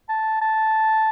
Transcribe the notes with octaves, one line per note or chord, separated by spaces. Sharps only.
A5
A5